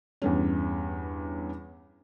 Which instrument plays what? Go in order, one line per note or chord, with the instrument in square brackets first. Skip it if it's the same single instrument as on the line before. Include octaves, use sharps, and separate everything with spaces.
[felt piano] E2 G2 C#4